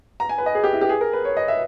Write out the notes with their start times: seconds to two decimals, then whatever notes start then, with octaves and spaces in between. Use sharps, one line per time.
0.20 A#5
0.29 G#5
0.38 B4
0.46 D#5
0.55 G#4
0.64 G4
0.73 E4
0.81 G4
0.89 G#4
1.01 A#4
1.13 B4
1.25 C#5
1.37 D#5
1.48 E5